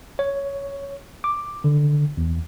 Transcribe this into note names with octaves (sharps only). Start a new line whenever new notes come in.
C#5
D6
D3
E2